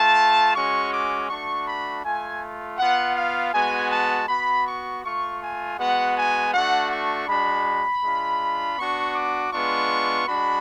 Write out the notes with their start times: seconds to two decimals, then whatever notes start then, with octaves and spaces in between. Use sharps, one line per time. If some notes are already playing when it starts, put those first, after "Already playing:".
Already playing: A3 F4 A5
0.54 G#3 C#4 F#4 C#6
0.91 D6
1.28 A3 D4 F#4 C#6
1.66 B5
2.03 A3 F4 G#5
2.78 B3 F4 F#5
3.16 F5
3.53 G#3 B3 F#4 G#5
3.91 A5
4.28 B3 F#4 B5
4.66 C#6
5.03 A3 F4 C#6
5.41 G#5
5.77 G#3 B3 F#4 F#5
6.15 G#5
6.53 A3 D4 F#4 F#5
6.90 C#6
7.27 G#3 D4 F#4 B5
8.03 G#3 D4 F4
8.77 B3 D4 F#4 C#6
9.14 D6
9.52 G#3 B3 D4 F4 C#6
10.26 G#3 D4 F#4 B5